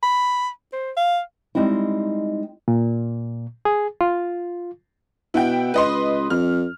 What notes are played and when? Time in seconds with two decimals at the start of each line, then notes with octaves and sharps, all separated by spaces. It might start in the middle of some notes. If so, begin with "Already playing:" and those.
0.03 B5
0.73 C5
0.97 F5
1.55 G3 G#3 C4 D#4 E4
2.68 A#2
3.65 G#4
4.01 F4
5.34 B2 E4 F#5 G5
5.74 C#2 B4 D#5 C6
6.30 F2 F6